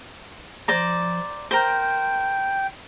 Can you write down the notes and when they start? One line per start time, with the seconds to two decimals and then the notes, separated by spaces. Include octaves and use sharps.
0.68 F3 C5 D5 A#5
1.51 A#4 C5 G5 G6